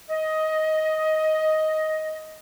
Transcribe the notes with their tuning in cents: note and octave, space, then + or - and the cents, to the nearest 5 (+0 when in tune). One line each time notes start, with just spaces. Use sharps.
D#5 +10